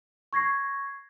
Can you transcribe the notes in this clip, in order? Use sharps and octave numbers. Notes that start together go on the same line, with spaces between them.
C#6 G#6 A#6 C7